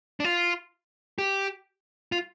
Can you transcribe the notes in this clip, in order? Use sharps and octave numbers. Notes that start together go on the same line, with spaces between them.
D4
F4
G4
F4